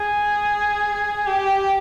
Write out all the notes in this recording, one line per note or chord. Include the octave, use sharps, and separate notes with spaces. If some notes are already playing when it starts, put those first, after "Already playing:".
Already playing: G#4
G4